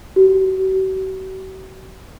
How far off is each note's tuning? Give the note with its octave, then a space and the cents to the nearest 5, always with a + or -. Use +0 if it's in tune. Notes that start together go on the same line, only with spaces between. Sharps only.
F#4 +45